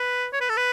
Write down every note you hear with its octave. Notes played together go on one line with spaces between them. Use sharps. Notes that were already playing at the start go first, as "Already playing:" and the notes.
Already playing: B4
C#5
B4
A4
B4